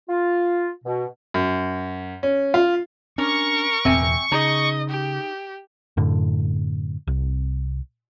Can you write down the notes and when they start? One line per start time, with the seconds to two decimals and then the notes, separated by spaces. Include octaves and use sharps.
0.09 F4
0.84 B2
1.34 F#2
2.23 C#4
2.54 F4
3.18 C#4 D4 A#4 C#6
3.85 E1 E2 A2 C4 E5 G#5
4.32 C#3 D#4 G#4 D#5
4.90 G4
5.97 F#2 A2 D3
7.07 C2